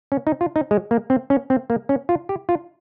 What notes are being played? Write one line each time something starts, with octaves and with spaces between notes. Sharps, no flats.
C#4
D#4
F4
D#4
G#3
A#3
C4
C#4
C4
A#3
C#4
F4
G4
F4